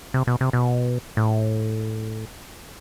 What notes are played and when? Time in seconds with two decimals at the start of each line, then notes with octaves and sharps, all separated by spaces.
0.14 C3
0.27 B2
0.41 C3
0.53 B2
1.17 A2